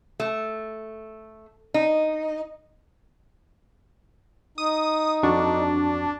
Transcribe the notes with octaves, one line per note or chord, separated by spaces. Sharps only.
A3
D#4
D#4 D#6
F2 D4 F#4 C#6